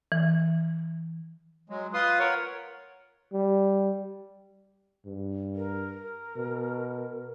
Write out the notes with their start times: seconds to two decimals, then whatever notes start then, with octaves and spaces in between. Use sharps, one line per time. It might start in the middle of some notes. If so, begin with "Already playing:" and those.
0.12 E3
1.70 F#3 G#3
1.94 F4 B4 C6 D#6
2.19 A#4 C#5 F#5
3.33 G3
5.05 G2
5.56 A#4
6.36 B2